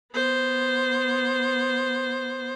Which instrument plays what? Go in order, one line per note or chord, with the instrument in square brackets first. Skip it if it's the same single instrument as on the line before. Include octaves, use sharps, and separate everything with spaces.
[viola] B3 C5